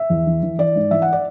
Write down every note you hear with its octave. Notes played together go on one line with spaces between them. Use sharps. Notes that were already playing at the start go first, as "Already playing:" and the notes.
Already playing: E5
E2
E3
E3
E3 D5
G#2
E3 E5
F#5
D5